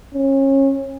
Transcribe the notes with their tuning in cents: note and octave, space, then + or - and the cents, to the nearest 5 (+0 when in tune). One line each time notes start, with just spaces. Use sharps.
C#4 -30